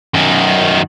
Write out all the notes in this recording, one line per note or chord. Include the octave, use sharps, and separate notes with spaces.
F#2 D#3